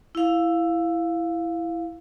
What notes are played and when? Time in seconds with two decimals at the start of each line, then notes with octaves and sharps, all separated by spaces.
0.15 E4 F5